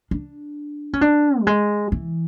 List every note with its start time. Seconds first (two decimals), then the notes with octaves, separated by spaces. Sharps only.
0.11 D4
0.93 C#4
1.01 D4
1.43 F#3
1.47 G#3
1.92 E3